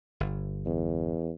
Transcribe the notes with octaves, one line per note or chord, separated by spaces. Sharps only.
G1
E2